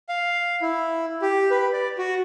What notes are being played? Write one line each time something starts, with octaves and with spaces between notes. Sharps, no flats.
F5
E4
G4
B4
D5
F#4